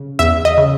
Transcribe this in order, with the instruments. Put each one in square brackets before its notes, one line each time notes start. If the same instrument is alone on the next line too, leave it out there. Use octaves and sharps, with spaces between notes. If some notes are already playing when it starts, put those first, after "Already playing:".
Already playing: [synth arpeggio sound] C#3
E2 E5
D#5
C#3